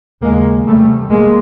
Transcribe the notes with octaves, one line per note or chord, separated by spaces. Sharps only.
D#2 C#3 G#3 A#3
E2 C3 G3 A3
C3 G#3 A#3